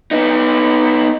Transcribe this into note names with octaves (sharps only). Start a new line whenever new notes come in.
B3 D#4